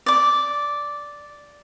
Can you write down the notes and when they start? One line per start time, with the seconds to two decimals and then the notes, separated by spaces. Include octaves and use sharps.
0.06 D5 D6